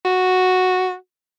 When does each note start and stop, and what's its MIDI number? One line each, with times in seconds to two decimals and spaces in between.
0.05 0.95 66